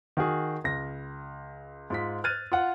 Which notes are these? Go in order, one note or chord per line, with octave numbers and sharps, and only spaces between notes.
D#3 F#4 G#4
C#2 A#6
G#2 F4 B6
F6 F#6 G#6 A6 D#7
F4 F#5